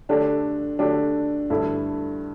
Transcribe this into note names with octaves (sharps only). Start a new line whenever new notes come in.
D3 A3 D4 G4
D3 A3 D4 G4
G2 D3 A3 E4